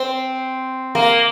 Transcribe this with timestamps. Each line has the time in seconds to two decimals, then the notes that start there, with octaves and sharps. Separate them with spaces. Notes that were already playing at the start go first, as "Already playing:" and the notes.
Already playing: C4
0.95 A#3